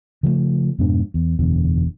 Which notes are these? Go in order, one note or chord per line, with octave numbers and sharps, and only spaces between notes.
C#3 F3 G3 A3
F2 G#2 B2 D4
E2
F#1 E2 B2 D3